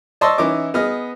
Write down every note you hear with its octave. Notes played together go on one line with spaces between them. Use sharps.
D5 D#5 A5 C6 C#6 E6
E3 C#4 D#4 E4 D6
B3 G#4 D#5 F6